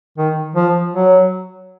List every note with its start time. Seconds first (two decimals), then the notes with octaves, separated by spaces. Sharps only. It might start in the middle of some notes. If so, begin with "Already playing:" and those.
0.18 D#3
0.56 F3
0.94 F#3